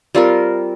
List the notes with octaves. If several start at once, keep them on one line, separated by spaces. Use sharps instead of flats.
G3 C4 F4 A#4